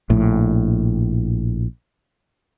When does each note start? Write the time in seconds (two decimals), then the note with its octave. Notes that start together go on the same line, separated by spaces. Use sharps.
0.10 A#1 A2